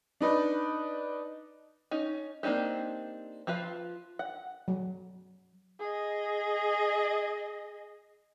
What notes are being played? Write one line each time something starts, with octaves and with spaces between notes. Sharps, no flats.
D4 D#4 B4
C#4 D#4
A#3 C4 D4 D#4 G4
F3 F4 B4 F5
F#5
F#3
G#4 D#5